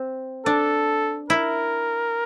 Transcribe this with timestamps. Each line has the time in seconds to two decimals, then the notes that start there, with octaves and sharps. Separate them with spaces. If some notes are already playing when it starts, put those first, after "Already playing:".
Already playing: C4
0.46 D4 A4
1.30 E4 A#4